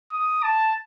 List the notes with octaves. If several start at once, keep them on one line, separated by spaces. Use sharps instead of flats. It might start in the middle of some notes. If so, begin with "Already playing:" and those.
D#6
A5